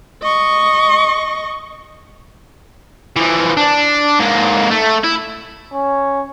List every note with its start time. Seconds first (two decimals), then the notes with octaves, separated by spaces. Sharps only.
0.23 D#5 C#6
3.16 E3 F3
3.57 D4
4.19 G#2 A#3
4.70 A3
5.04 E4
5.74 C#4